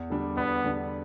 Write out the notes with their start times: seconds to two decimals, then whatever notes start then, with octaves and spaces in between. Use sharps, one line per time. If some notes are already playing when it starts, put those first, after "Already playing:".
Already playing: E2
0.10 D3 G3 D4
0.37 E2 B3
0.64 D3 G3 D4